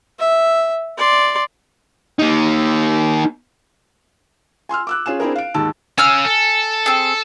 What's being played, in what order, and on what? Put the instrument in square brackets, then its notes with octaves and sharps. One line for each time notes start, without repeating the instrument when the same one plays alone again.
[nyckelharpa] E5
D5 C6
[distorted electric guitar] A#3 D#4
[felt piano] G#5 C6 E6 F6
D6 E6 F#6
C#4 F4 G#4 E7
C4 D4 E4 G#4 A#4
F5 D7
D#2 G#2 A5 E6
[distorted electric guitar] C#4 F5 [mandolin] G#5 E6 F6
[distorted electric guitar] A4
[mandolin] C4 G#4